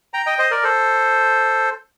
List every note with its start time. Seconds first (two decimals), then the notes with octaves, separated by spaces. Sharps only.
0.14 G5 A#5
0.26 D#5 G5
0.38 C5 D#5
0.51 A#4 D5
0.63 A4 C5